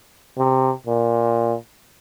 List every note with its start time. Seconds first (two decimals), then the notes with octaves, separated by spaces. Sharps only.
0.38 C3
0.87 A#2